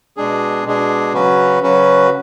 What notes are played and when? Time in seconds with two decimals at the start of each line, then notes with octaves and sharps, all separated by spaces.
0.17 B2 G#3 D4 G#4
0.65 B2 G#3 D4 G#4
1.13 C#3 F#3 C#4 F#4 B4
1.62 C#3 F#3 C#4 F#4 B4